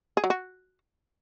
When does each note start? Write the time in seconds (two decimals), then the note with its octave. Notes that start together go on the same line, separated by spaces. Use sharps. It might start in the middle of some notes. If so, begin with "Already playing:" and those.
0.17 G#4
0.24 F#3
0.30 F#4